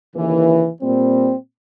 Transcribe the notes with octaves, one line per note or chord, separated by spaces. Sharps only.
D#2 C#3 E3
A#2 G3 C4